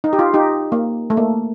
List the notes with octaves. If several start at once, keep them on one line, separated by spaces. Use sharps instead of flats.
D#4
G4
F4
D#4 G4
A#3
A3
A#3